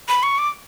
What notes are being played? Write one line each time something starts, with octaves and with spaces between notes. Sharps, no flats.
B5
C#6
D6